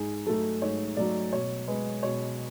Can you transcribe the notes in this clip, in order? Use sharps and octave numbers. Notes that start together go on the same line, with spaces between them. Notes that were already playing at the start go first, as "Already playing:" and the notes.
Already playing: G#2 G#4
F#3 A3 A4
G#2 C#5
F#3 A3 D5
B2 C#5
G#3 B4
B2 C#5